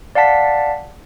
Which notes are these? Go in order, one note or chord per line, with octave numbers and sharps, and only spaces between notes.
D5 F5 F#5 A5 B6